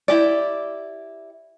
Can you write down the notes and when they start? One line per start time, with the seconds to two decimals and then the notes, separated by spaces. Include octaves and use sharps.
0.08 E4 G4 D5